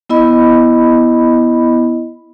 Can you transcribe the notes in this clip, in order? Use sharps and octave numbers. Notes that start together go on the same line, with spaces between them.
B3 E4 D#5 B5